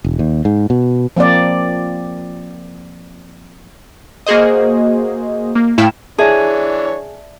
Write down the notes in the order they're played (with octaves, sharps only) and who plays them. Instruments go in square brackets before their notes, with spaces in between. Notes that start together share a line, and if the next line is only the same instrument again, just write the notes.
[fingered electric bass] E1
D#2
G#2
B2
[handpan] F3 A#3 C4 D5
[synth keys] A#3 F#4 G#4 C5 D#5
A#3
A2 A3 E4 F5 G5 E7
[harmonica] E3 D4 C#5 [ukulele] G#4 [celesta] D5 E5 A5